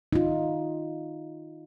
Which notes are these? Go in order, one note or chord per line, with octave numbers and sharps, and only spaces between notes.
D#4 F4